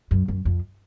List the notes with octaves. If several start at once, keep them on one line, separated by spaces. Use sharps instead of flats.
F#2
F#2
F2